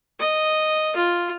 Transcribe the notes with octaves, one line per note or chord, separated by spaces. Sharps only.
D#5
F4